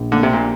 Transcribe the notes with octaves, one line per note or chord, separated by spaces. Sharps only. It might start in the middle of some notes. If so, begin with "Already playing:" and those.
Already playing: A#1
D3 A#3
C3
A#2